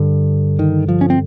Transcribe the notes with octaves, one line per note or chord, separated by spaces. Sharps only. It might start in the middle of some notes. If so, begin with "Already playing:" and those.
Already playing: G2 D3
D#3
F3
C#4
C4